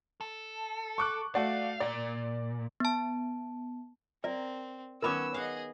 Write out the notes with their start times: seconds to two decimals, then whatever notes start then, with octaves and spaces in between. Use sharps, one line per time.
0.21 A4
0.98 C#6 D6 F#6
1.35 A3 F#4 D5 F5
1.80 A#2 D5
2.80 B3 A5
4.24 C4 A#4 D5
5.02 D#3 B3 C#4 A#4 C#5 B5 D6 E6
5.34 G#4 D#5 F5 F#5